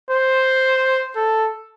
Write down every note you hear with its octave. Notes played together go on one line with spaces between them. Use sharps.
C5
A4